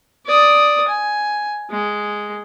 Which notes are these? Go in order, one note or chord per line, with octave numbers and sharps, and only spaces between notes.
D5 D#6
G#5
G#3